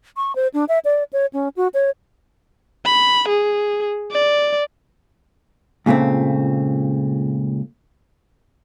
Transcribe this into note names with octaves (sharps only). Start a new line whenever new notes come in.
C#6
C5
D4
E5
D5
C#5
C#4
F#4
C#5
B5
G#4
D5
C#2 A#2 C#3 A3 C4